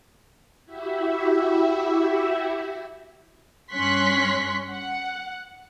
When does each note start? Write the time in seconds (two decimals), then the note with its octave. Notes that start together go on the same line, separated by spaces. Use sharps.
0.65 E4 F#4 G4 E5
3.73 G2 C#4 C6 C#6 F#6 B6
4.69 F#5